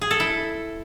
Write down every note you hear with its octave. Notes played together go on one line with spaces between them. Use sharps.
G#4
A4
E4